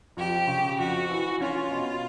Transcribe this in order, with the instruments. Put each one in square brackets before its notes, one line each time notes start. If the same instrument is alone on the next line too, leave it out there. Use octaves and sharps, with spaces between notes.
[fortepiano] F2 [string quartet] G4
[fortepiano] C#3
[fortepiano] F2 [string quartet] F#4
[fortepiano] E3
[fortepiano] C#4 [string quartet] F4
[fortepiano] B2